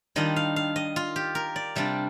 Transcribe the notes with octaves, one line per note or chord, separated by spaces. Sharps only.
D#3 G3 D4 F4 D#5
F5
F5
D#5
F4
G4
A#4
D5
C3 G3 D4 F4